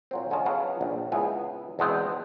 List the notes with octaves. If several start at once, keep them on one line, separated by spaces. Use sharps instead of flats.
A#2 F#3 C4
D3 C#4 F4 D#5 A5
C#3 F#3 B3 F5 F#5
A#1
C#2 B3 E4 G#4 G#5
E2 B2 G#3 B3 C4 G5